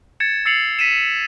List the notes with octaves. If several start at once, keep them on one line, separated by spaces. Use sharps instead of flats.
G#6 A6 C#7 E7
E6 A6 C7 C#7 F7 F#7
B6 D#7 E7